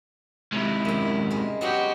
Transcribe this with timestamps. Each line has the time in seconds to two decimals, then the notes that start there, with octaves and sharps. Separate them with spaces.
0.53 G#2 C3 E4
0.85 F#2 G5
1.31 G3 G#3
1.61 F#3 G#3 B3 F#4 G4